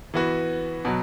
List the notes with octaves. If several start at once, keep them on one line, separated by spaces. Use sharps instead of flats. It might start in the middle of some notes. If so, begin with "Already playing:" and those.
E3 B3 F#4
B2 F#3